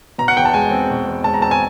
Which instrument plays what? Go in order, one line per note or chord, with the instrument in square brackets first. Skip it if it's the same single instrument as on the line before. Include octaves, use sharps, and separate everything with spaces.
[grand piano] B2 A#5
F#5
E2 G5
A5
G#3 G#5
C4
B2
E2
G#3 A5
A#5
C4 A5
G#5